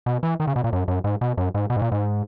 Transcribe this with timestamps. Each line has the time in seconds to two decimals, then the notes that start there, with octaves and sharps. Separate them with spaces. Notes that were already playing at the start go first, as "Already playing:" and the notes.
0.06 B2
0.23 E3
0.40 D#3
0.47 C#3
0.56 B2
0.64 A#2
0.73 F#2
0.88 F#2
1.04 G#2
1.21 B2
1.37 F#2
1.54 G#2
1.70 B2
1.76 G#2
1.82 A#2
1.92 G#2